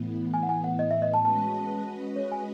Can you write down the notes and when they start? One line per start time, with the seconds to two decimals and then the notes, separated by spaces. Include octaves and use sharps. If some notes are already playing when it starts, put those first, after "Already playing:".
Already playing: A2 E3 B3
0.34 G#5
0.43 F#5
0.49 G#5
0.64 F#5
0.79 D#5
0.91 E5
1.02 D#5
1.14 A5
1.25 G#3 C#4 F#4 B4 D#5 A5
2.16 C#5
2.32 G#5